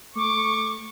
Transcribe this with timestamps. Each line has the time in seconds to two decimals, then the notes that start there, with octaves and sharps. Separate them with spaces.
0.16 A3 C#6 D6